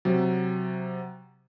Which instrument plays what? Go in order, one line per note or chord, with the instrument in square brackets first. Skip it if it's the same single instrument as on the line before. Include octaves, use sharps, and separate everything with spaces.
[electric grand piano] C3 F#3